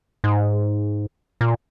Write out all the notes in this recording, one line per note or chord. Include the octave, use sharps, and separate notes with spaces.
G#2
A#2